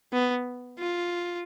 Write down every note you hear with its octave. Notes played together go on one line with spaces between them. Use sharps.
B3
F4